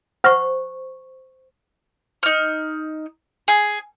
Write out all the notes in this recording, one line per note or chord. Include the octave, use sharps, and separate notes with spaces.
C5 F#5 C#6 F6 A#6
D#4 F6
G#4